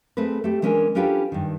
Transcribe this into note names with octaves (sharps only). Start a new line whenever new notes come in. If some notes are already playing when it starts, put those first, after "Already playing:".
A3 C4 G#4 B4
A3 G4
E3 G#3 C#4 D4 A#4 G#5
C#4 D4 F4 G4 A4 B4
G2 D#3